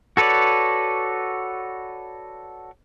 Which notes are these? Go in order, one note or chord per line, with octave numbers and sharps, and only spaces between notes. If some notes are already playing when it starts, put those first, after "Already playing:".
F#4 A4 B4 C#5 D5